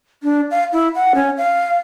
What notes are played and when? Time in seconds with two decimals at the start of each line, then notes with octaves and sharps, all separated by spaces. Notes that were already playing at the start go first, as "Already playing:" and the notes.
0.23 D4
0.51 F5
0.73 E4
0.95 F#5
1.15 C#4
1.38 F5